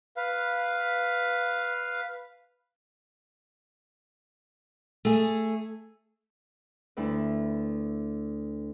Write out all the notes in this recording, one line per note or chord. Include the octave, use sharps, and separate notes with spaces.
B4 F5
A3 G#4
D2 E4 B4